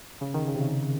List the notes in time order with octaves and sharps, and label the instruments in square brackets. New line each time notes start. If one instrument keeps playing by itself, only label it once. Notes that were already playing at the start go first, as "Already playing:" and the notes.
[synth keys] C#3
D#3
C#3
C3
C#3